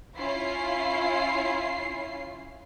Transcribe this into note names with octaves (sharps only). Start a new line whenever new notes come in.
C#4 E4 F4 C7